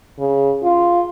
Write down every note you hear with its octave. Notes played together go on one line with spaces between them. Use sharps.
C#3
F4